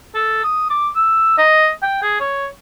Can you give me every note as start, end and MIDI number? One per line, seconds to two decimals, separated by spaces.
0.15 0.42 69
0.44 0.69 87
0.70 0.89 86
0.95 1.35 88
1.38 1.70 75
1.82 1.99 79
2.02 2.16 68
2.20 2.47 73